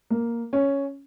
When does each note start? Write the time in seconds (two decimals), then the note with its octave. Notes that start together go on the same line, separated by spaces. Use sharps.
0.10 A#3
0.53 C#4